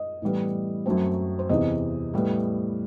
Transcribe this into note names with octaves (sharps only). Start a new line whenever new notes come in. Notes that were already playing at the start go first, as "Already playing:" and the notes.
Already playing: D#5
A2 E3 G3 B3
F#2 F#3 A3 C4
C5
E2 C3 E3 D#5
A2 G3 B3